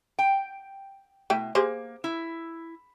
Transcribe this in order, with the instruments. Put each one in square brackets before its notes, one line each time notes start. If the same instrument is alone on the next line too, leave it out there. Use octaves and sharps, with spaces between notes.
[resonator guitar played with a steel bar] G5
[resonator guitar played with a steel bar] B2 [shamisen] A3 E4 G5
[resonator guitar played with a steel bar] A#3 [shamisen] G4 G#4 C5
[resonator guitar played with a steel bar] E4